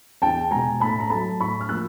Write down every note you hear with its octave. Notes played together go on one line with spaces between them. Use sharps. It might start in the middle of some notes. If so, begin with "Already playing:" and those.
E2 G5 A5
B2 G#3 G#5 A#5
A2 A5 B5
A#5
F#3 A3 A5 B5
A2 B5 C#6
F6
F3 A#3 E6 F#6